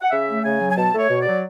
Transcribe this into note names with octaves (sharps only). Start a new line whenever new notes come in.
F#5
C#3 E5
A3
C#3 G#5
F#3
G#5
B2 A5
A3
C#5
B2
D5
F#3